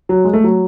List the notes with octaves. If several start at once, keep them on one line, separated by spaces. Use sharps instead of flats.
F#3
G#3
A3
F#3